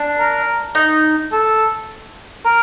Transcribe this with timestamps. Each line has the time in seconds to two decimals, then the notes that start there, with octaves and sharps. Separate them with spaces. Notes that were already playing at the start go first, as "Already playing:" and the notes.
Already playing: D4
0.19 A#4
0.75 D#4
1.32 A4
2.45 A#4